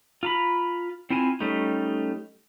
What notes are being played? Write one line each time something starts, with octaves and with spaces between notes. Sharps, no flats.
F4 A#5 B5
C4 E4 F4 G#5
G3 A3 C#4 D#4